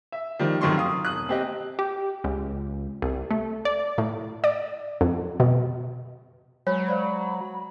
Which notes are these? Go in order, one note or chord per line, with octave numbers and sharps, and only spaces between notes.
E5
D#3 F3 G3
F1 F#2 D#3 F#3 C6 C#6
F5 D#6
E1 D#6 F#6
C4 G4 D#5
G4
C#2
C2
A3
D5
A2
D5
F2
B2
F#3 G#3 C#5 B5
C5 D5 F5